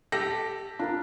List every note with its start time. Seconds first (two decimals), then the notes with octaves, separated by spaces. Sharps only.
0.12 G4 A4 A#6
0.79 D4 F4 A#4 B5